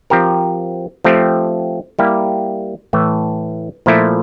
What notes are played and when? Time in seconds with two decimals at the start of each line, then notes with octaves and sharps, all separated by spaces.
0.10 F3 C4 G4 A#4
1.05 F3 A3 C4 G4
1.99 G3 A#3 E4 G4
2.93 A2 E3 A3
3.86 A#2 F3 A3 E4